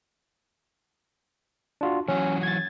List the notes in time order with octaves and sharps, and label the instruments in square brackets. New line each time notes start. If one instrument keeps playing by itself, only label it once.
[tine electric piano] D4 F4 F#4
[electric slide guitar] E3 F#3 F#4 [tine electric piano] C#4
[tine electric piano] G#6 A6